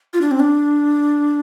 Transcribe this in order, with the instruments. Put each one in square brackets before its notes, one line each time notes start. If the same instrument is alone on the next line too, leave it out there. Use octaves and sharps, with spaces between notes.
[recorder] F4
D4
C4
D4